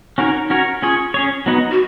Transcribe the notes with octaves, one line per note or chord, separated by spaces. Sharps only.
C#4 D#4 F#4 A#4 C#5
C#4 F#4 A#4 C#5
C#4 F4 G#4 C#5
C#4 G#4 C#5
F#3 B3 D#4 F#4 B4
F#4